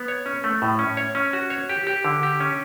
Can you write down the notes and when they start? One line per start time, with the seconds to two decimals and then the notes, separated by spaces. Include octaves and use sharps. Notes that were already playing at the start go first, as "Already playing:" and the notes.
Already playing: B3
0.08 C#5
0.26 C#4
0.44 A3
0.62 A2
0.79 C#4
0.97 C#5
1.15 C#4
1.33 F#4
1.50 C#5
1.69 G4
1.87 G4
2.05 D3
2.23 G4
2.40 C#4